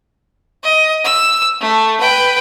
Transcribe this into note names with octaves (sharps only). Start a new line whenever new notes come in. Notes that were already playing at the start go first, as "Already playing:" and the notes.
D#5
E6
A3
B4 G5